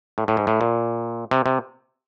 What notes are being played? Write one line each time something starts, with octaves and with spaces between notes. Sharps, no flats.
A2
A2
G#2
A2
A#2
C3
C3